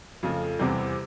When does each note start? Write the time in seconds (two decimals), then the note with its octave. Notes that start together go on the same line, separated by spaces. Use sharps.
0.23 F2 C#3 F3 A3
0.59 E2 C3 E3 G3 C4